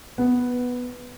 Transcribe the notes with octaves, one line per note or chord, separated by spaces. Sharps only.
B3